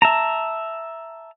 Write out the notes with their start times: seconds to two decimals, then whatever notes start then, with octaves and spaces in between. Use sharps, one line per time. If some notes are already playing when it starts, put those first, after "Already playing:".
0.02 E5 A5 A#5